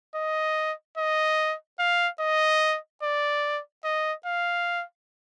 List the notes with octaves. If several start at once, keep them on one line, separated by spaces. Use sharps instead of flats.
D#5
D#5
F5
D#5
D5
D#5
F5